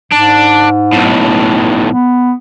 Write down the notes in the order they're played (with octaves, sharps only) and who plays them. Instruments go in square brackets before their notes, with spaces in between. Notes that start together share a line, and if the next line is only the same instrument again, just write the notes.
[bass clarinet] G#2 [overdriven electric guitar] D4
[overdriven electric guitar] B1 A2
[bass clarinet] B3